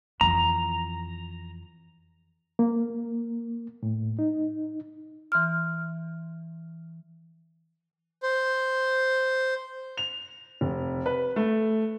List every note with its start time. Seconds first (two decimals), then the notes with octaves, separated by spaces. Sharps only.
0.21 F2 E3 A#5
2.59 A#3
3.83 A2
4.19 D#4
5.32 E3 C6 F6
8.23 C5
9.97 F7
10.61 F1
11.06 B4
11.36 A3